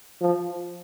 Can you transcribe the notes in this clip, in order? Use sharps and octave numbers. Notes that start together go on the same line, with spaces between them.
F3